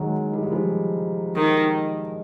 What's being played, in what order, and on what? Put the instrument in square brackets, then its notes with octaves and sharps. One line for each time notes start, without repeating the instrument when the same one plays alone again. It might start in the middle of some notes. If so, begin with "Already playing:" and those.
Already playing: [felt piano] D#3 F#3 G#3
G3
G#3
F3 G3
[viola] D#3